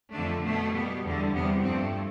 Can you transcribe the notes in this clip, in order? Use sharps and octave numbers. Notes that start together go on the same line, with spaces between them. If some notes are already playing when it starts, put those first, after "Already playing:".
F2 D3 A3 D4
B2 A3
B2 G3 B3
E2 D3 G3
E2 C3 G3 B3
G2 F3 A3 C4